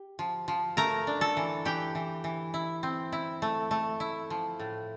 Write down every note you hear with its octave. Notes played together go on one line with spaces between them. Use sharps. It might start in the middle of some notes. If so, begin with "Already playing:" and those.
Already playing: G4
F3
F3
A3 A#4 A#5
D4
A4 A5
E3
E3 G4 G5
E3
E3
E4
C4
E4
A3
A3
E4
F3
A2